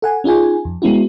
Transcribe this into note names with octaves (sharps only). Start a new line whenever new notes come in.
A4 F#5 G#5
C#4 D#4 F4 G#4 G#5
F2
G#3 B3 C#4 E4 F#4